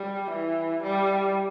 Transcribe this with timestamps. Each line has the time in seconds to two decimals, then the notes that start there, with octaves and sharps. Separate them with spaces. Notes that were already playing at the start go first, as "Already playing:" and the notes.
Already playing: G3
0.30 E3
0.83 G3